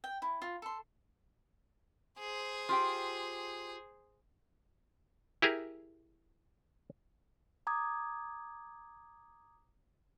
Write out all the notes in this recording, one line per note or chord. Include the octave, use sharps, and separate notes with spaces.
G5
E4
F4
A4 C6
G#4 C5
F4 G4 G5
E4 G4 G#4 A#4
A#5 D6 D#6 G#6